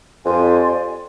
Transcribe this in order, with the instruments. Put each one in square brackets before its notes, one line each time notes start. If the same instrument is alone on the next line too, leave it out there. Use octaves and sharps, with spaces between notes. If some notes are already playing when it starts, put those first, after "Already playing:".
[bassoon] F2 [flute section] G4 D5 G#5 C6